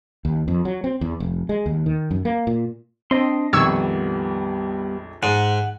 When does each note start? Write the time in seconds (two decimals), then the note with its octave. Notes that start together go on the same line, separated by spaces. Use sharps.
0.25 D#2
0.48 F2
0.65 F#3
0.84 C4
1.01 E2
1.20 F1
1.49 G#3
1.66 D#2
1.86 D#3
2.11 F#2
2.25 A#3
2.47 A#2
3.11 C4 D4 D#5 C6
3.53 A#1 F2 D#3 G3 B3 C#6 E6 G#6
5.23 G#2 F#5